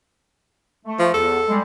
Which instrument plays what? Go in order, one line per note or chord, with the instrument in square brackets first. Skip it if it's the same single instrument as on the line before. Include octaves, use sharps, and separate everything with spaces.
[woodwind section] A3
[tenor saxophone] F3
[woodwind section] E2 [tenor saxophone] A4
[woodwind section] G3 G#3